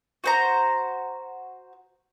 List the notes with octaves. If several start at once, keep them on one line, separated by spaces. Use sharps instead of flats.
F#4 C5 A#5